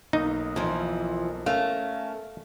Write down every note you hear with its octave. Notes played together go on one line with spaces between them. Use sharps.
B1 A#3 D#4 D#6
F2 E3 F3
A3 C#4 A#4 F5